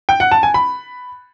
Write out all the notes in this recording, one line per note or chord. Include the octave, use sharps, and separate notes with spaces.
G5
F#5
A5
G#5
B5